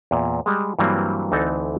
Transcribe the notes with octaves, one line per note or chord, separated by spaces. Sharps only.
E2 A#2
G3 G#3
G2 E3 F#3 G3 A#3 C4
D2 E3 C4 D#4 A4 A5